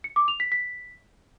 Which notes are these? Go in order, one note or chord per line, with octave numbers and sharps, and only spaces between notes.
C#7
D6
F7
B6
B6